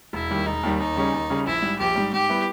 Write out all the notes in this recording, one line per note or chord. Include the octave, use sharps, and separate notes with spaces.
E1 E4
D#2 D#3 G3
E1 D#4
D#2 D#3 G3
D#2 D#4
C#3 G3 C#4 G#4
D#2
C#3 G3 C#4 G#4
A#1 E4
G#2 G3
A#1 G4
G#2 G3
G#2 G4
G3 B3 E4